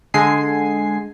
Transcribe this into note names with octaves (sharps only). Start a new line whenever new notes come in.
D3 G#3 G#5 C7